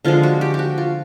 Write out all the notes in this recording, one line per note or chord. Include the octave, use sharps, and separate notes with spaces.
D3 F3 G#3 F4
F#4
G4
G4
F#4
F4